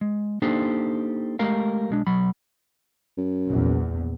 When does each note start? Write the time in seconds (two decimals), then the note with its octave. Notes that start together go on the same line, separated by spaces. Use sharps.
0.01 G#3
0.42 A#3 D4 D#4 G4 A4 C5
1.39 G#3 A3 G4 A#4 F5
1.90 B1 G#3 D4
2.07 B1 F#3 B5
3.18 F#2
3.48 A#1 E2